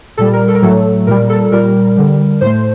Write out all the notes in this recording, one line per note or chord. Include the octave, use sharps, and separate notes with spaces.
A#2 G3 A4
A#4
A4
A#4
A2 F#3 A3 A4
A#2 G3 A#4
A4
A#2 G3 A#4
D3 G3
A2 A3 C5